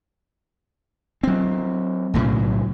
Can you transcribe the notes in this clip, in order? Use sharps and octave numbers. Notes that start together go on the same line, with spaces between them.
F#3 C4
B1 A2 C#3 F#3